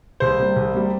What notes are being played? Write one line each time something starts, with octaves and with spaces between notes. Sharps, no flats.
C2 C5
C3 G3
C2
C3 G3